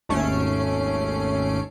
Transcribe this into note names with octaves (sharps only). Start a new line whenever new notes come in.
G#1 D#2 A3 C#4 C7 D7